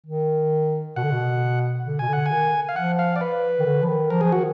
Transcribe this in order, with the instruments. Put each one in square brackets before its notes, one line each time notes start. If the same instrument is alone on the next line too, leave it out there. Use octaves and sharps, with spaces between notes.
[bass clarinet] D#3
[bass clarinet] B2 [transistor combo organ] F#5
[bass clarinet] D3
B2
D3
[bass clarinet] B2 [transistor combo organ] G#5
[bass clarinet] D3 [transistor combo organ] F#5
[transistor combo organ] G#5
[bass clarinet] D#3
[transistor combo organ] F5
[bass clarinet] F3 [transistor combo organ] F#5
[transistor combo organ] F5
D5
B4
[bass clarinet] D#3
D3
F3
D#3
[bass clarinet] F3 [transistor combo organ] A#4
[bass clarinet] F3 [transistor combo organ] G#4
[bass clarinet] D#3 [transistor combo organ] F#4